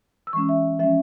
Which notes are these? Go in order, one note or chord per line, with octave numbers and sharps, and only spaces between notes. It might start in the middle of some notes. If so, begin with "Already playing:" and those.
E6
E3 G#3 C#4 C#6
E5
F3 G#3 C#4 E5